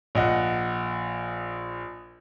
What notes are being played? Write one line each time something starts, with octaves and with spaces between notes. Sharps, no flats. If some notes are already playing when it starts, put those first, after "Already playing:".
A#1 D#5 F#5